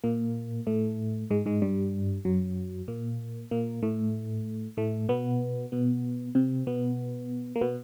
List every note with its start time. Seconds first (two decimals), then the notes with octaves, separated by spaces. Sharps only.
0.04 A#2 A#3
0.67 A2 A3
1.30 G#2 G#3
1.46 G#2 G#3
1.62 G2 G3
2.25 F#2 F#3
2.88 A#2 A#3
3.51 A#2 A#3
3.83 A2 A3
4.77 A2 A3
5.09 B2 B3
5.72 B2 B3
6.35 C3 C4
6.67 B2 B3
7.56 A#3
7.61 B2 B3